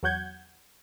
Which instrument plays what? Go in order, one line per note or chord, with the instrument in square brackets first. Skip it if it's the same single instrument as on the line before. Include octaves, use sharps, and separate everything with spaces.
[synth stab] E2 F#3 F#4 F#5 G6 G#6